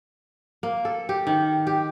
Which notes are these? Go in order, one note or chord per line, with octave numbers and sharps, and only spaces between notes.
A#3
A4
G4
D#3
G4